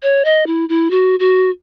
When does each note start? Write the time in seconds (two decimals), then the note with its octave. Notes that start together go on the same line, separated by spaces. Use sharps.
0.02 C#5
0.25 D#5
0.46 E4
0.69 E4
0.91 F#4
1.19 F#4